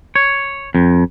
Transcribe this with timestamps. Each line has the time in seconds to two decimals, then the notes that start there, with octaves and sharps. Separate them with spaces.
0.15 C#5
0.75 F2